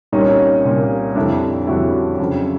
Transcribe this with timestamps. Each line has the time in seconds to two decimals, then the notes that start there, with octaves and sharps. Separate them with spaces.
0.12 C2 A#2 G3 C#4 D#4
0.64 C2 A#2 G3
1.15 F2 D3 G3 D4 E4
1.67 F2 D3 G3 E4 F#4
2.19 F2 C#3 F#3